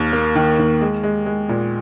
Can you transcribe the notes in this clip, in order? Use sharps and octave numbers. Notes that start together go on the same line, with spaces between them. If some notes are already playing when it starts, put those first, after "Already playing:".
Already playing: D#2 F6
A#3
D#3
D#2
G#3
G#3
G#3
A#2